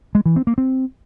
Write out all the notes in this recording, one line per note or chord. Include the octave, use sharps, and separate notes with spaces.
G#3
E3
C4
A#3
C4